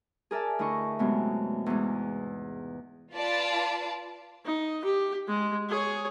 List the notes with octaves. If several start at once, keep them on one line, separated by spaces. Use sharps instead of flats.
G#4 A#4 D5 E5 A5
D2 E4 D#5 C#6
F#2 C3 G#3 A3 B3
E2 G#2
F4 B4 D5 A5
D#4
G4
G#3
G#4 C#5